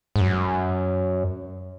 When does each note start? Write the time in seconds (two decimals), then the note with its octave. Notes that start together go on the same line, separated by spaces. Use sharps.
0.16 G#2
0.20 F#2